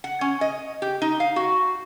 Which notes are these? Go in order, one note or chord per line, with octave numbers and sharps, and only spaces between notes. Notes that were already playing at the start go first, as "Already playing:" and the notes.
F#5
C#4
D#5
G4
D#4
F5
F#4